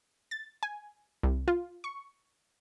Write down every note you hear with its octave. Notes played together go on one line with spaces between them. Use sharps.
A6
G#5
C2
F4
C#6